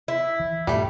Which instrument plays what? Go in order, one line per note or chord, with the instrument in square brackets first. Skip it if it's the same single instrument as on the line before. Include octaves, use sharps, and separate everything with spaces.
[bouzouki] E4
[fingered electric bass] E3
[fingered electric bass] G2 A#2 D#3 [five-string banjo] G3 A3